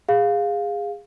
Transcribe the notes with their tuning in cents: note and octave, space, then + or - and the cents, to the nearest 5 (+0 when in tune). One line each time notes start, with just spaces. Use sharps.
G#4 -25 F5 +10